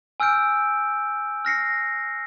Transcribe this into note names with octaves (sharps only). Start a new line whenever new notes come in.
G#5 E6 F6 G6 D7
F6 A#6 C7 C#7